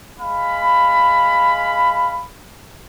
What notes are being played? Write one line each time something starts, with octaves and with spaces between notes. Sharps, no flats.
G#3 F5 B5